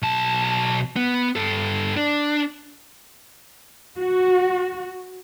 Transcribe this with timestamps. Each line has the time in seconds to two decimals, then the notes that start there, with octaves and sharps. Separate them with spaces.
0.02 B1 A5
0.96 B3
1.36 G2 A4
1.97 D4
3.98 F#4